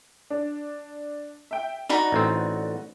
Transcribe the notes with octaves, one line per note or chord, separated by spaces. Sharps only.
D4
E5 G5
D#4 F#4 D5 F#5 B5
A1 C4